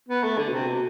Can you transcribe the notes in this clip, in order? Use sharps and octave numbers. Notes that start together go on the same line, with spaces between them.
B3
A3
D3
B2
C3
B2